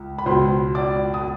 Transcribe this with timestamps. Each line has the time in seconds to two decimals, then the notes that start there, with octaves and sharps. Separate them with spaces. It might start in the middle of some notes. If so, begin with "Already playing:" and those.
Already playing: C#2
0.18 B5
0.26 C#2 B2 C5 C6
0.75 D5 D6
1.14 D#6